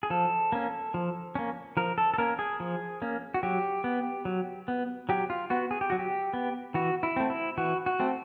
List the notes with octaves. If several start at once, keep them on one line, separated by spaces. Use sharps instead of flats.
G#4
F3 A4
A#3 C#4
F3
A#3 C#4
F3 A#4
A4
A4
A#3 C#4 A#4
G#4
F3
A#3 C#4
F#4
F#3 G4
B3
F#3
B3
F#3 G4
F4
B3 F#4
G#4
G4
F#3 F#4
G4
B3
E3 F#4
E4
A3 C4
E4
E3 F#4
F#4
A3 C4